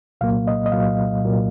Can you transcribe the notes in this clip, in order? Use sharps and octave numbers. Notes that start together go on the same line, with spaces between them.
C2 A#2 F#3 A#3 F5
D#5
D#5
C2 A#2 F#3 A#3 F5
C2 A#2 F#3 A#3